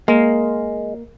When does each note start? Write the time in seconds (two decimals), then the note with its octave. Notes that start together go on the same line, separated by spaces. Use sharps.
0.08 G#3 A#3